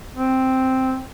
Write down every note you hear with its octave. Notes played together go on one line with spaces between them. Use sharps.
C4